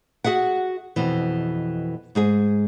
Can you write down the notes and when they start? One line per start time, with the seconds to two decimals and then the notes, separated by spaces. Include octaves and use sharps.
0.24 F#4 G#4 E5 F#5
0.96 F2 B2 E3
2.15 G#2 G#3 G#4